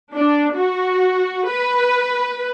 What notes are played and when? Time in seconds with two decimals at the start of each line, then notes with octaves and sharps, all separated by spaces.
0.14 D4
0.55 F#4
1.49 B4